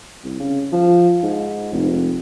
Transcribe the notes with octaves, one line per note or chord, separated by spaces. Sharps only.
C2
C#3
F3
G#2
F1